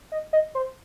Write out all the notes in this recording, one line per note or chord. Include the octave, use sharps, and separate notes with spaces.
D#5
D#5
C5